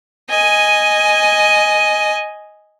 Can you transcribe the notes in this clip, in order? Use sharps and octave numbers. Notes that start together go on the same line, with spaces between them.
D#5 G#5